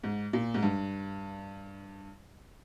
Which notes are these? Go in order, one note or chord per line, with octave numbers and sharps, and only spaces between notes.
G#2
A#2
G#2
G2